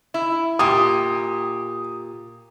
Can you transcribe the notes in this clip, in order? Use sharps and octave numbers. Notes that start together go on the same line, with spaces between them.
E4
A#2 G4 D#6